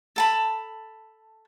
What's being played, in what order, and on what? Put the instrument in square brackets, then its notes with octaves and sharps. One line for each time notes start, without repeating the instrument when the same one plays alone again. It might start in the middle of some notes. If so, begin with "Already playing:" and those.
[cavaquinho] A4 A5 B5